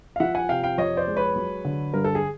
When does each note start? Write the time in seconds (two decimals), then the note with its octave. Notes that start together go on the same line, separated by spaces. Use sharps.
0.16 F5
0.20 F3 E5 F#5
0.35 F#5 G#5
0.49 C3 F5 G5
0.63 F5 G5
0.78 F2 C#5 D#5
0.97 C5 D5
1.07 G#3
1.17 B4 C#5
1.36 F#3
1.65 D3
1.94 G2 A#4
2.04 A4
2.15 G#4